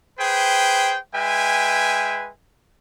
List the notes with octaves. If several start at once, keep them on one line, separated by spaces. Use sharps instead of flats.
G#4 B4 C5 G5
G#3 B4 E5 G5 G#5